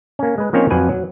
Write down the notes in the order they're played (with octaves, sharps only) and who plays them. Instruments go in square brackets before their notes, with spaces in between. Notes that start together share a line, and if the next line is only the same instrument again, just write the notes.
[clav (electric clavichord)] A#3 C#4
G#3 B4
F3 A#3 C4 C#4 D#4 C#5
F2 F3 F#3 B4 F#5 G#5
F#3